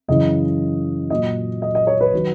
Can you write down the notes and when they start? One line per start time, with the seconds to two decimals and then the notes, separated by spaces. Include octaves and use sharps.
0.08 F#2 C#3 E3 D#5
1.10 A#2 F#3 D#5
1.62 D#5
1.75 D#5
1.87 C#5
2.01 B4
2.13 D#3 F#3